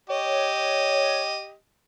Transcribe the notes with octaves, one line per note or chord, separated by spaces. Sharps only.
G4 C#5 D#5